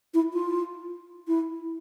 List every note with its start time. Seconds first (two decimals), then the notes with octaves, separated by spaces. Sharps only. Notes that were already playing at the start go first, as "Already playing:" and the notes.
0.14 E4
0.33 F4
1.28 E4